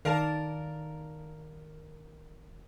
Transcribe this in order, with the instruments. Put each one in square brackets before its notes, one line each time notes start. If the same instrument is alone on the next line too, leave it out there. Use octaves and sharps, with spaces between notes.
[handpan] D#3 D5 [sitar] A#4 [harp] F5 A5